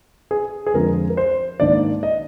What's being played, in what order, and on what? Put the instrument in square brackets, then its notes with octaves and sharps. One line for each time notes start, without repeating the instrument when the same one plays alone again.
[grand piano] G#4
G#4
F2 D3 F3 G#3 A#4
A#4
C5
G#2 D#3 A#3 D4 D5
D#5